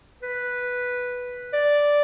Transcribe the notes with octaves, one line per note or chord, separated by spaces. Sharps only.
B4
D5